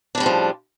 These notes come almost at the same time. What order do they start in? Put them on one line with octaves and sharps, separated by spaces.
D4 A2 G3 C#3 F3